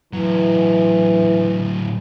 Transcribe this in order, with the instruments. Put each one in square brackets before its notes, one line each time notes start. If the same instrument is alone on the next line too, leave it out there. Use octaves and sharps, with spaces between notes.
[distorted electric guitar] A2 F#3 [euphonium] E3